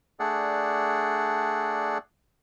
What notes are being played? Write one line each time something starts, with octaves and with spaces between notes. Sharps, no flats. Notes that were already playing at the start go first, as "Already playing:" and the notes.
A3 D4 G#4 D5 F#5